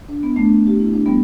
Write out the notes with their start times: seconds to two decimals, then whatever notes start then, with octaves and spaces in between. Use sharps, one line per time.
0.08 D4
0.23 B3
0.36 A3 D4
0.67 G4
0.80 E4
0.93 D4
1.06 G3 B3